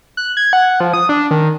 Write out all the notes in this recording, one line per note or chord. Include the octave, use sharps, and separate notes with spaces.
F#6
G#6
F#5
F3
D#6
D4
D#3